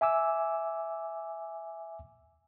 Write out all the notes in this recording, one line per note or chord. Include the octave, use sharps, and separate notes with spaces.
E5 G#5 D6 E6